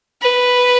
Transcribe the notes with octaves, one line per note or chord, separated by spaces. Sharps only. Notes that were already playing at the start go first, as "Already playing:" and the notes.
B4